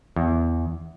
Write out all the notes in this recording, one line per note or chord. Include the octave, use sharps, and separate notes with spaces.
E2